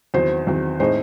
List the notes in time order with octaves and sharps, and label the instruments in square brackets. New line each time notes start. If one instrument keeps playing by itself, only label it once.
[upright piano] E2 D#3 F#3 C4 [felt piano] C5
[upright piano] E2 D#3 F#3 C4
[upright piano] A2 G#3 C4 D#4 [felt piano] C5